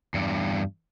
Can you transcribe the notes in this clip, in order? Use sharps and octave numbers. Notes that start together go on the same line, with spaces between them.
E2 G2